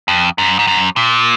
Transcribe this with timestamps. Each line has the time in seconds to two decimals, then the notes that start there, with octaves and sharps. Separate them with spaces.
0.08 F2
0.38 F#2
0.59 G#2
0.67 F#2
0.96 A#2